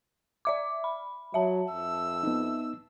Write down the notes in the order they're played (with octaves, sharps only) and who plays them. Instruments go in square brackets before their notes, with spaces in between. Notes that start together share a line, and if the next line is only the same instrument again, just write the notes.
[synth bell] D5 E5 D6
B5
[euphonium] F#3 [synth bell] E5 A5
[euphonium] F2 [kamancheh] E6
[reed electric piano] B3 D#4